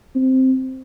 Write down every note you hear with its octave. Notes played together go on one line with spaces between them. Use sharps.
C4